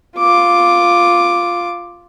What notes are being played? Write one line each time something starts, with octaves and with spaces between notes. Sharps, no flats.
F4 D6